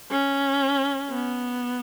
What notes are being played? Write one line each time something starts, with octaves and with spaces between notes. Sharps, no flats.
C#4
B3